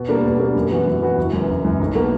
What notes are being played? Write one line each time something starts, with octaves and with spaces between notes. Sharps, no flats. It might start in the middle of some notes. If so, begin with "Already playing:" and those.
Already playing: B2
G3 A#3 D4
B2
G3 A#3 D4
F#2
E3 B3 F#4
F#2
E3 B3 F#4
F#1
F#2 E3
F#1
F#2 E3
B1
B2 F#3 A#3